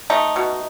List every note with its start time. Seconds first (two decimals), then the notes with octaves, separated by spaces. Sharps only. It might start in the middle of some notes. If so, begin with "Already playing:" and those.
0.10 A3 D#4
0.36 B2